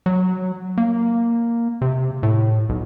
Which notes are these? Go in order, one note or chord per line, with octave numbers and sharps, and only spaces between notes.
F#3
A#3
C3
A2
B1